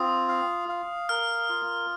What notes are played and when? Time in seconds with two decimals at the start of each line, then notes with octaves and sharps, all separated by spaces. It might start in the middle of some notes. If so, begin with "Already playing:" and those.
Already playing: C4 F4 D#6
0.28 F5
0.69 F5
1.09 A#4 F6
1.49 F4